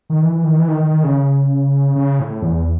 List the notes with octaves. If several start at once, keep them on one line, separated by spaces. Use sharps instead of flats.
D#3
E3
E3
D#3
E3
D#3
D#3
D#3
C#3
C#3
A2
E2